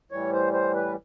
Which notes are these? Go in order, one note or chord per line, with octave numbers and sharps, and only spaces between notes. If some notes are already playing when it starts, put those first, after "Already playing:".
A2 E3 G3 C#5
C5
C5
B4